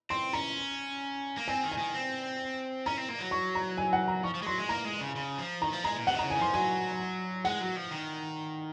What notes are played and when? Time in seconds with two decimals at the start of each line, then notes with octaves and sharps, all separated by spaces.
0.10 C4 C6
0.33 C#4 A#5
1.37 A#3
1.48 C4 G#5
1.64 D#3
1.72 G#5
1.78 D#3
1.94 C4
2.86 C#4 A#5
2.97 C4
3.09 A#3
3.20 F#3
3.31 C#6
3.55 A#5
3.78 G#5
3.93 F#5
4.08 A#5
4.23 F3 C#6
4.35 F3
4.42 G#3
4.46 F#3 C6
4.58 G#3
4.69 A#3 A#5
4.85 G#3
5.01 C#3
5.16 C#3
5.38 F3
5.62 D#3 A#5
5.73 F3
5.84 G#3 A#5
5.96 A#2
6.07 C3 F#5
6.15 D#3
6.19 A#5
6.22 C#3
6.30 G#5
6.38 F3 C6
6.53 F#3 G#5
7.45 G#3 F#5
7.61 F#3
7.76 F3
7.91 D#3